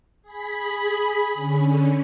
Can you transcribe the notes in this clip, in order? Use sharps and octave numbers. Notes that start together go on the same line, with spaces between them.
G#4 B5
D3 C#4